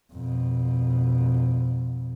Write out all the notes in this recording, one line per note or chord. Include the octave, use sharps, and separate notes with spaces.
F2 B2